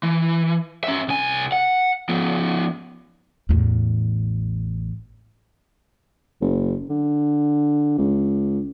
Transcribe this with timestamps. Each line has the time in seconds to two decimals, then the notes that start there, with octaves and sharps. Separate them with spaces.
0.03 E3
0.84 C#4 E5
1.08 C2 G#5
1.52 F#5
2.09 F3 B3
3.49 A1 E2
6.42 F#1
6.90 D3
7.98 C#2